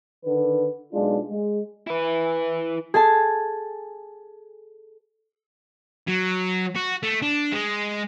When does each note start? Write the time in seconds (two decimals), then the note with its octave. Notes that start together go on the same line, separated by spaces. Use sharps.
0.24 D3 D#3 B4
0.93 B1 G#3 D4 F4
1.29 G#3
1.87 E4 B4
2.94 G#4 A4 G#5 A5
6.08 F#3
6.75 F#4
7.03 A3
7.22 D4
7.53 G#3